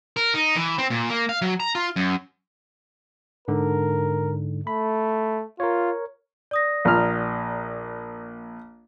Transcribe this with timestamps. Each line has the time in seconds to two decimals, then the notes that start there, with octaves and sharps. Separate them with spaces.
0.17 A#4
0.34 D#4
0.56 E3
0.78 C4
0.90 A#2
1.10 A#3
1.29 F5
1.42 F#3
1.60 A#5
1.75 F4
1.96 F#2
3.48 G#2 D3 A#4
4.67 A3 B5
5.60 F4 A#4 C#5
6.51 D5 D#6 A#6
6.85 A#1 A#2 F6